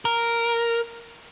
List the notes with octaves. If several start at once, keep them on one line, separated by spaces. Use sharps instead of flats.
A#4